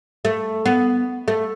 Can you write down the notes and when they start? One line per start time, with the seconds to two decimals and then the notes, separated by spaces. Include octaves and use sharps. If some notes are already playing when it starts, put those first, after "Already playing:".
0.25 A3
0.66 B3
1.28 A3